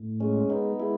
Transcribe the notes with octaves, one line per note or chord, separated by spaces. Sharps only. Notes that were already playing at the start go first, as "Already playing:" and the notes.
Already playing: A2
G#3 C#4
B3 D#4
G#3 E4